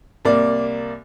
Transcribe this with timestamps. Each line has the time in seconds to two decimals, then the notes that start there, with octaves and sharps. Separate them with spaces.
0.25 C2 A#3 D5